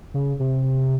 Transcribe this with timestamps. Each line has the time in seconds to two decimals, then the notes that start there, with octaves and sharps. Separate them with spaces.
0.14 C#3
0.39 C3